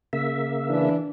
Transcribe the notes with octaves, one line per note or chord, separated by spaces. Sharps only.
C#3 A#3 E5
E3 D4